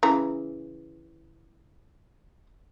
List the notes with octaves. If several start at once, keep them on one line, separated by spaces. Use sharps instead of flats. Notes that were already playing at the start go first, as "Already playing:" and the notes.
C#3 E3 A#5